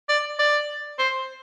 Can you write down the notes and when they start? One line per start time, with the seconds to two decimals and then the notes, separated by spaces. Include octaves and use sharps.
0.09 D5
0.39 D5
0.99 C5